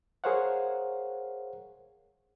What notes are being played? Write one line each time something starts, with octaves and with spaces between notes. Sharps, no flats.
G#4 A#4 C5 C#5 F5 F#5